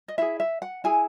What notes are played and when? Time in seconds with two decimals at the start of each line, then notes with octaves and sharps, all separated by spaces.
0.08 D#5
0.18 E4 G#4 E5
0.40 E5
0.62 F#5
0.84 E4 G#4 G#5